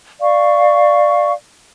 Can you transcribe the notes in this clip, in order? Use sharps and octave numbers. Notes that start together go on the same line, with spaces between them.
D5 F5 C#6